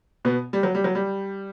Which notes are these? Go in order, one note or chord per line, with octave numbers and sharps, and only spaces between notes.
B2 B3
G3
F#3
G3
F#3
G3